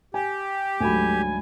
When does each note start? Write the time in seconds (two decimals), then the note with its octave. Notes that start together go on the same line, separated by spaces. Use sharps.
0.14 G4 G#5
0.80 D2 G#2 F#3 G3 F#4 G#5 B5